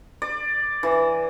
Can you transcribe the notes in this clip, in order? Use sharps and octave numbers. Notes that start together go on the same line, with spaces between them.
D5
E3